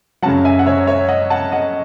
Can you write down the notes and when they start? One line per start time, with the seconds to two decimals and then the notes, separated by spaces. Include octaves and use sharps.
0.23 F#2 C#3 F#3 F#5 A5
0.44 E5 G#5
0.59 F#5
0.66 C#5 E5
0.87 C#5 E5
1.09 D#5 F#5
1.30 F#5 A5
1.52 D#5 F#5